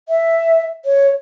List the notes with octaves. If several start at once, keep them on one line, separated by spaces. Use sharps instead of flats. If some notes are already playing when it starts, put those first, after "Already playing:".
E5
C#5